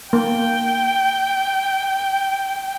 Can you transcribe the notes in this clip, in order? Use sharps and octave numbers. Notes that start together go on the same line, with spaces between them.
A#3 G5